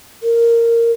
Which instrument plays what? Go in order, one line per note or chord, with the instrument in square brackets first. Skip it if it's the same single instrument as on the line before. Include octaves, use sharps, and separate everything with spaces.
[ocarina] A#4